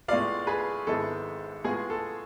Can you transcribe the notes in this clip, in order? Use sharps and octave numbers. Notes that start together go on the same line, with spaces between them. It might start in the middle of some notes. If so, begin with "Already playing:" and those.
A2 G#3 B3 F4 D5 F5
G#4 B4
G#1 G#2 G#3 B3 E4 A4
A2 G#3 B3 F4 G#4
A4